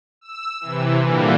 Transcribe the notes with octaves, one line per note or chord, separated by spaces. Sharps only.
E6
C3 E3
A#2 D3 E3 G3 A#3